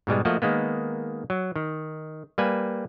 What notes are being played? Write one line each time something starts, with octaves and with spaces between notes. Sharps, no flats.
G#2 B2 G3 G#3
F3 A3 A#3 F#4 D#5
D#3 G#3 A#3 B3
F#3
D#3
G3 A#3 B4 G#5